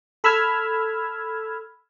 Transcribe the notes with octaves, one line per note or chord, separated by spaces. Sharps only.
A4 B5 E6 F6 G#6